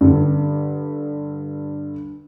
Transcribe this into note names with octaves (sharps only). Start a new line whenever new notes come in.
G2 D3